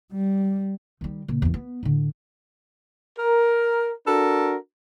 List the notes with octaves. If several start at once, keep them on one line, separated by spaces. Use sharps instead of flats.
G3
D#3 G3
A#2 C#3
E2 G2
B3
A2 D3
A#4
D4 F#4 A4 A#4